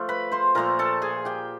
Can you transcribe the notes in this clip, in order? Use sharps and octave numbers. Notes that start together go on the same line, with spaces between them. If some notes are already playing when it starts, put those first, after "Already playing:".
Already playing: F3 A3
B4 B5
C5 C6
A#2 F3 A3 A#4 A#5
A4 A5
G#4 G#5
G4 G5